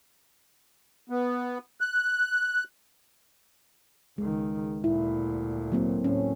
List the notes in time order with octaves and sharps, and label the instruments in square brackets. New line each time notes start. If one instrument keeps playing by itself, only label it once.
[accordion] B3
F#6
[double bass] C#2 D#3 [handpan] G#3
[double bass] D2 A#2 [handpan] E4
[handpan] F#3 A#3 C4
[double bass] A2 [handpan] C#4